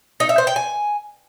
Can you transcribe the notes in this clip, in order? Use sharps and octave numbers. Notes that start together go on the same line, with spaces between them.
D#4
E5
C5
G5
G#5